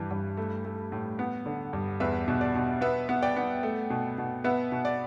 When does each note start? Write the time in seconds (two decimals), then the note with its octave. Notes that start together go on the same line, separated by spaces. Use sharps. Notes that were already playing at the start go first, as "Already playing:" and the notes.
Already playing: G2 E3
0.11 G2
0.37 A3
0.65 A3
0.92 A2
1.19 B3
1.46 D3
1.73 G2
2.00 E2 B4 E5
2.28 B2
2.41 D5
2.55 B2
2.81 B3 B4 E5
3.09 B3
3.22 D5 G5
3.37 B3
3.63 A3
3.90 B2
4.18 B2
4.44 B3 B4 E5
4.72 B2
4.85 D5